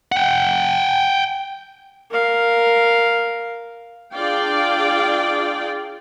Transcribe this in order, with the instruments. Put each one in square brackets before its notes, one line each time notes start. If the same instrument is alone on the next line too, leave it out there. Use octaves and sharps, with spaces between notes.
[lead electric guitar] F#5 G5
[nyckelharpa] A#4 F5
[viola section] D4 F4 G#4 D5 F5 G5